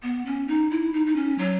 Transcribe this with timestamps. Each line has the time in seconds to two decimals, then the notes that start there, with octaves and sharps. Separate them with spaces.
0.03 B3
0.26 C#4
0.48 D#4
0.71 E4
0.93 D#4
1.06 D#4
1.16 C#4
1.38 F#3